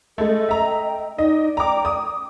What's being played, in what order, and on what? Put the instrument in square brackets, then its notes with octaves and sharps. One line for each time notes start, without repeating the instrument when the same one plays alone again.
[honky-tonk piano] G#3 A3 [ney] A4 [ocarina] D#5
[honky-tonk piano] E5 A#5
[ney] G5
[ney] D#4 [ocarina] D5 [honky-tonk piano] D#5
[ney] G5 [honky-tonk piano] A#5 D6
[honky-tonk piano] D#6